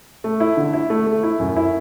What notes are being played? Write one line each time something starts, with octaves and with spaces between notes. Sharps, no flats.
A3
E4
D3
E4
A3
A3
E4
F#2
E4